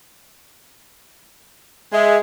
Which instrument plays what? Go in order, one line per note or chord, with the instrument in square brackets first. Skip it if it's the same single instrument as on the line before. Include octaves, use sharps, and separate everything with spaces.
[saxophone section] G#3 [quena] E5